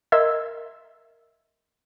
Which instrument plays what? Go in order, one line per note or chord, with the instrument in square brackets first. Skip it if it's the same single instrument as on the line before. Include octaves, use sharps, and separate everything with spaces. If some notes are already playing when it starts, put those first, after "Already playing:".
[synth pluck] A#4 D#5 E5 C6 E6 G#6